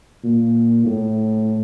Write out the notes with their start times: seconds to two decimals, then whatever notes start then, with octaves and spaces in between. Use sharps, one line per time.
0.24 A#2
0.86 A2